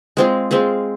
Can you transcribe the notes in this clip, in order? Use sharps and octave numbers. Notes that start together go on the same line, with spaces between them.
G#3 C4 F4 G#4
G#3 C4 F4 G#4